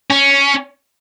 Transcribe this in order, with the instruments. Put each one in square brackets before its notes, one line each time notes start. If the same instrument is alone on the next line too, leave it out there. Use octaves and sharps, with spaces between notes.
[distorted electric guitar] C#4